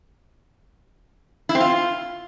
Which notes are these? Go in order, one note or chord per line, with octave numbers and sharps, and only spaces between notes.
E4
C4
F4